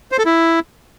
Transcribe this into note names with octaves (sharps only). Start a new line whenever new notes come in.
C5
A4
E4